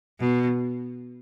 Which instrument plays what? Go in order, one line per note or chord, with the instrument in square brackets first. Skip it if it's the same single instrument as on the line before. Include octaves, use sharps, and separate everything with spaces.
[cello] B2